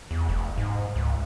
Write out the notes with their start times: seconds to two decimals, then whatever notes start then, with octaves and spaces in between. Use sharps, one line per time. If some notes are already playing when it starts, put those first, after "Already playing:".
0.11 E2
0.29 F1
0.58 G#2
0.96 C#2